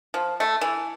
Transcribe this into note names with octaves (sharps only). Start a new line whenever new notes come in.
F3
A3
E3